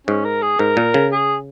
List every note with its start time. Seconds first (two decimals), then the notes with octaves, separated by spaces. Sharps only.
0.07 G#2 C#4
0.25 A#4
0.42 G#4
0.59 G#2 A#4
0.77 A#2
0.94 C#3
1.12 G#4